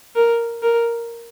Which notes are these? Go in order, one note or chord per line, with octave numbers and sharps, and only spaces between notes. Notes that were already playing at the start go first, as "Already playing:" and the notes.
A#4
A#4